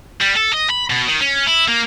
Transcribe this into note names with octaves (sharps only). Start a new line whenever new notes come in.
G3
A4
D#5
B5
B2
D#3
C#4
E4
A#3